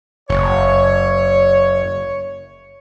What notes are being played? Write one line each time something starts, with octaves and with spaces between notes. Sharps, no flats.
F#1 C#5